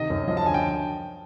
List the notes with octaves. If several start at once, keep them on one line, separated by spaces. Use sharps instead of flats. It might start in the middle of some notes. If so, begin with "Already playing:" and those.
Already playing: C3 D#3 D#5
F#2
F3 D#5
A5
D3 G#5
G5